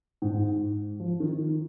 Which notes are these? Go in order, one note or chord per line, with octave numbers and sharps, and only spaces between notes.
G#2
F3
D#3